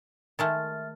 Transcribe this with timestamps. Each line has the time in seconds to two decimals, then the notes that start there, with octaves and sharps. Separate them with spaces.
0.39 D#3 G#3 A3 E5 F6 A6